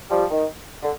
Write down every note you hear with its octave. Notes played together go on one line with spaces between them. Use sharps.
F3 G3
D#3
D3